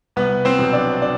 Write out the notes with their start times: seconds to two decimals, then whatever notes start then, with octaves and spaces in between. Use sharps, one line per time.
0.16 C2 B3 B4
0.45 C4 C5
0.59 B2 F#3
0.73 D4 D5
1.02 D4 D5